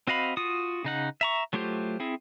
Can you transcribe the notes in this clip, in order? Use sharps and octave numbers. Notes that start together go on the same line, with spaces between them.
C4 F#4 D#5 F5 B5
F4 F#4 D#6
C#3 D#4 F#5
E5 A#5 C#6
F#3 A3 F4 G4 C5
C4 E4 G#4